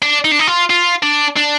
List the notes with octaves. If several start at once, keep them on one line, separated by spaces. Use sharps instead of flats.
D4
D#4
D4
D#4
F4
F4
D4
D4